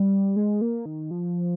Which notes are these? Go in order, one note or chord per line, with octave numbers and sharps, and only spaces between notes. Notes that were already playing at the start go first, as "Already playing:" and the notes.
Already playing: G3
G#3
A#3
D#3
F3